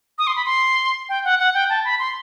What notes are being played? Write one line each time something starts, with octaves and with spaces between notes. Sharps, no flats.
D#6
C6
B5
C6
G5
F#5
F#5
G5
A5
B5
C6